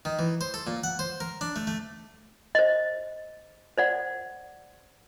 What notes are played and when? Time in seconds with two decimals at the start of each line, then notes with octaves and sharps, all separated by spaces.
0.05 D#3
0.19 E3
0.41 C5
0.54 A4
0.67 A#2
0.84 F#5
0.99 C5
1.20 A#4
1.41 D4
1.56 A3
1.67 A3
2.55 C5 D#5
3.78 C5 D5 F#5